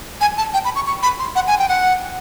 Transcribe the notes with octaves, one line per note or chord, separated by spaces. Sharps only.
G#5
A5
G5
B5
C#6
C#6
B5
C6
F#5
G#5
G5
F#5